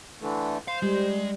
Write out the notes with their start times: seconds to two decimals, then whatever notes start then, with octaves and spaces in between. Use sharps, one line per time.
0.21 D3 E3 A3
0.68 C5 F5
0.82 G3 G#3